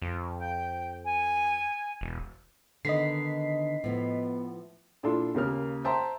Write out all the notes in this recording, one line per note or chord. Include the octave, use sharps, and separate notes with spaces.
F2
G5
G#5
E1
D3 D#3 B3 D#5 B6 C7
A2 F3 B3
A#2 D4 E4 F4 A4 C6
D#2 C#3 A#3 F6
C5 E5 G5 A5 A#5 C6